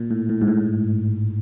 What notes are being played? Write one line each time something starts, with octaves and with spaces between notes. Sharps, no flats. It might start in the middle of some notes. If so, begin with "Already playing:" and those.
Already playing: A#2
A2
A2
G#2
A2